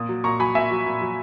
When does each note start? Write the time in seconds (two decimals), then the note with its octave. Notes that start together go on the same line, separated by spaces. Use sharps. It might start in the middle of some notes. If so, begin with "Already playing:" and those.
Already playing: A#2 D#6
0.09 F#3
0.24 A#2 A#5 C#6
0.39 F#3 G#5 B5
0.55 A#2 E5 G#5
0.71 F#3
0.86 A#2
1.02 F#3